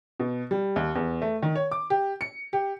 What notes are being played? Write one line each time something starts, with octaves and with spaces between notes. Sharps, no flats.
B2
G3
D#2
E2
A3
D#3
C#5
D6
G4
C#7
G4